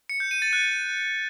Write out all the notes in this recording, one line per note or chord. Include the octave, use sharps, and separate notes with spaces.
C#7
G6
D#7
A6
F#6